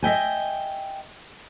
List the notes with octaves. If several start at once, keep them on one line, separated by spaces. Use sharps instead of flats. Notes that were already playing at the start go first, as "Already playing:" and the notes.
D#5 E5 G5 G#5